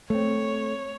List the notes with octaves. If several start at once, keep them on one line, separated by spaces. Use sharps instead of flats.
A3 C4 C#5